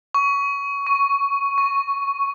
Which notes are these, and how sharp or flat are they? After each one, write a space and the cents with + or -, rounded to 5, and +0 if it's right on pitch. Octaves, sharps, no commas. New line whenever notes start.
C#6 +20
C#6 +5
C#6 -5